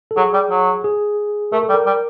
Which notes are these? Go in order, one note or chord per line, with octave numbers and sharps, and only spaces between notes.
A4
F#3 G#4
G3
F#3
G#4
A3 A#4
A4
G3
A#4
G3